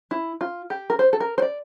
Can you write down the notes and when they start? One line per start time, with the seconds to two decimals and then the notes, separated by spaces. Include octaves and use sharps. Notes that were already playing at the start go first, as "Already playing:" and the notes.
0.11 E4
0.41 F4
0.70 G4
0.90 A#4
0.99 C5
1.13 A4
1.20 A#4
1.38 C5
1.42 D5